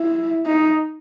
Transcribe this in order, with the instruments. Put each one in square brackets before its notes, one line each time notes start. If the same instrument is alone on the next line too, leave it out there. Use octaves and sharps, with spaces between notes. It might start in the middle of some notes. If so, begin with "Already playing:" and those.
Already playing: [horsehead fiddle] E4
D#4